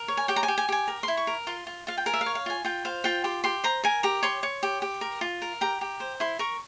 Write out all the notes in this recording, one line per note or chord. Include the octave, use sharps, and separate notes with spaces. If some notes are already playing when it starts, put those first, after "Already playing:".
Already playing: A#4
C#5
G#5
G4 G5
A#5
G#5
G4
G#5
G4 G#5
A#4
E4 C6
C#6
A#4
F4 C6
F4
F4 F5
G5
A#4 G#5
E5
F5
C#5
F5
F4 G#5
F4 G5
C5 F5
F4 G5
G4 C6
G4 C6
C5 A#5
A#4 G#5
G4 A#5
C#5 C6
C#5
G4
G4
A#4
F4
A#4
G4 A#5
G4
C5
E4 C6
A#4 C#6